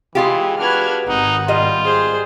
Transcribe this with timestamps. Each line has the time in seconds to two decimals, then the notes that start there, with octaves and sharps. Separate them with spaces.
0.15 E3 G#3 F4 G4
0.58 D4 F#4 B4 F#5 F6 G#6
1.08 G#1 D#4 F#5
1.48 G3 F4 D#5
1.85 G#4 C5